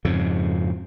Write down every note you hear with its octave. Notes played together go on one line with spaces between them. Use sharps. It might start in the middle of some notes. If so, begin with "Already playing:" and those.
F2 G#2 C#3